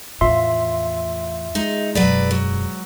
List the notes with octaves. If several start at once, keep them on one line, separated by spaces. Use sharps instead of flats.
E2 A2 F4 E5 C6
G#3 D#4
E1 F#2 F#3 B4 D5
F#3